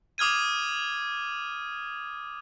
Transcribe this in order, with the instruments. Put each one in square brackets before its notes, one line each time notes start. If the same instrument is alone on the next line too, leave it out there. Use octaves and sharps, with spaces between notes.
[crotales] D6 D#6 F6 G#6 D#7